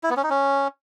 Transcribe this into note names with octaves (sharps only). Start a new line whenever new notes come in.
E4
B3
C#4
D#4
C#4